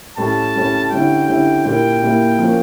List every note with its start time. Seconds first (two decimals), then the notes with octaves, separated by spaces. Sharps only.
0.17 A2 G3 C#4 A5
0.55 A2 G3 C#4
0.91 D3 G3 C#4 E4 G5
1.28 D3 G3 C#4 E4 G5
1.65 A#2 G3 A#3 E4 G5
2.02 A#2 G3 A#3 E4
2.38 F3 A#3 C#4